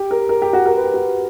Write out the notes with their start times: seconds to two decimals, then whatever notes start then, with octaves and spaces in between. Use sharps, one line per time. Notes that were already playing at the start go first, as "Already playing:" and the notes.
Already playing: G4
0.11 A#4
0.29 A#4
0.42 G4
0.53 F#4
0.66 A#4
0.76 B4
0.84 G4
0.94 F#4